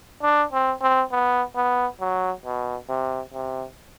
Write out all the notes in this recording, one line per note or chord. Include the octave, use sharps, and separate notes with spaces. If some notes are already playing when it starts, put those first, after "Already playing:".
D4
C4
C4
B3
B3
F#3
B2
C3
C3